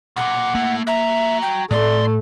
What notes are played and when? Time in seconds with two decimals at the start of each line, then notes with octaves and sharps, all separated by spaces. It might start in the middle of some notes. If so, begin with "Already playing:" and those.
0.16 B1 A#2 F#5
0.55 A3 A#3 E4
0.87 F#4 E5 A#5
1.42 G5
1.71 A2 F3 A3 D5 C6